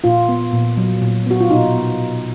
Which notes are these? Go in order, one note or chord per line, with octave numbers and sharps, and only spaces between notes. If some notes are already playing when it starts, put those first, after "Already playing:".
A#2 F4
B3
A#2
F#3
A#2
B3 F#4
F4
B2 D#4
B3
B2